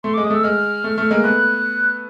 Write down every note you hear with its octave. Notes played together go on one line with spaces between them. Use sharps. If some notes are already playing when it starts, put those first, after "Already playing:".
A3 C6
G#3 D6
G#3 D#6
A3 E6
G#3 F6
A3
A3
G#3 A#3
A3 B3 F#6